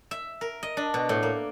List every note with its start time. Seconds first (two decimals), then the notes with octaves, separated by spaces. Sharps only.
0.11 E5
0.41 A#4
0.63 D#5
0.77 D4
0.94 B2
1.09 A2
1.23 A#3